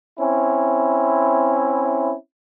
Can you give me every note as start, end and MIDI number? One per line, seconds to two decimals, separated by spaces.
0.19 2.13 60
0.19 2.13 61
0.19 2.13 64